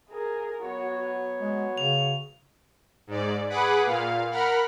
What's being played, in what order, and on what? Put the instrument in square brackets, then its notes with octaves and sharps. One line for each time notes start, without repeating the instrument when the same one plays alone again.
[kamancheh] G#4 A#4
[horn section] F#3 B3 C#5 [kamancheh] F#4
[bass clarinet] G#3 [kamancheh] F#4
[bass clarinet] C#3 [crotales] F7
[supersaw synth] G#2 D5
G#4 B4 F#5 B5 D6
A#2 F5
A#4 F#5 B5 F6